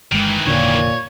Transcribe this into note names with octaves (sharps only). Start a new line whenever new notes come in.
G1 D#3 E3 G#3
F1 A#2 D3 D4 C#5